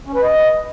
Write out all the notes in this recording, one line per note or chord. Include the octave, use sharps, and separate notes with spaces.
C#4
B4
D#5